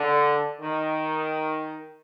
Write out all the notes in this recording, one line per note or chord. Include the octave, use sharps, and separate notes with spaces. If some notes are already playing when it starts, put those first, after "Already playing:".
Already playing: D3
D#3